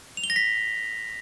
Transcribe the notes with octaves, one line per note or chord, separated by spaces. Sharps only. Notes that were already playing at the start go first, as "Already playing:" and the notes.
F7
G7
A#6
B6